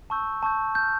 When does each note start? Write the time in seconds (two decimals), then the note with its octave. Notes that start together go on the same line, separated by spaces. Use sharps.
0.10 A5 C#6 E6 G6
0.43 A5 C#6 E6 G6
0.75 C#6 F6 G6